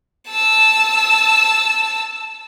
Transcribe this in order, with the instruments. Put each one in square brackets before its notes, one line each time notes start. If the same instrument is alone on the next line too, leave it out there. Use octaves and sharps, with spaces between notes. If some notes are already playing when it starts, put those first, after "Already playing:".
[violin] A5 E6